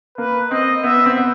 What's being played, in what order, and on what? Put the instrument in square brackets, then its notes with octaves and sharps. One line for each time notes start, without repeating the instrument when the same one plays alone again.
[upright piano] A#3 [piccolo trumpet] B4
[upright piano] C4 [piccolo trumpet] D#5
[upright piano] B3 [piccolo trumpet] E5
[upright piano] C4
B3